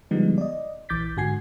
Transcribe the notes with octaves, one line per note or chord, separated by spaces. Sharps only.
D3 F3 G3 G#3 B3 D#4
D5 D#5
A#1 E3 D6 G6 A6 B6
G#2 D3 F#4 G#5 G#6 C7